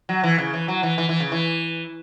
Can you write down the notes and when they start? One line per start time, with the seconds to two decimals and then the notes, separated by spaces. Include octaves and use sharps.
0.09 F#3
0.24 E3
0.38 C#3
0.53 E3
0.68 F#3
0.83 E3
0.98 E3
1.09 E3
1.20 C#3
1.32 E3